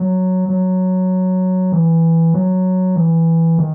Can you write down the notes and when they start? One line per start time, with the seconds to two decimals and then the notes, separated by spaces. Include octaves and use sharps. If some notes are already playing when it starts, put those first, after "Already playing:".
Already playing: F#3
0.49 F#3
1.72 E3
2.34 F#3
2.96 E3
3.58 D#3